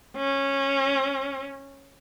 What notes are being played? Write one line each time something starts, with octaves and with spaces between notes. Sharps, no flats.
C#4